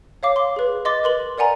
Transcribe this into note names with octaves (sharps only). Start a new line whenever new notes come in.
C#5 F5 D6
C6 D6
G#4 B4
D#5 C6 D6 A6
A#4 B4 C6 F#7
A#4 D5 F#5 G#5 A#5